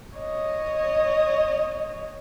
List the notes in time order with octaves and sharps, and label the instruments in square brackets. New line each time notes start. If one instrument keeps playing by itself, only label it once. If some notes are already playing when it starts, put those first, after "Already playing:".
[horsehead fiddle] C#5 D#5